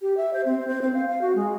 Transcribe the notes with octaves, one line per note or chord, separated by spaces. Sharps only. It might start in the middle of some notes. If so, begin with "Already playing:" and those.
G4
E5
C5
C4
C5
C4
F5
F5
F#4
G#3